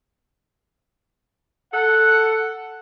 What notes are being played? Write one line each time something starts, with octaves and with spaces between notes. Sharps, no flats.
A4 F#5